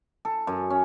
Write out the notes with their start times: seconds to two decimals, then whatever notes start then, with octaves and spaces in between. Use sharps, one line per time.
0.25 A4
0.47 F#2
0.70 C#4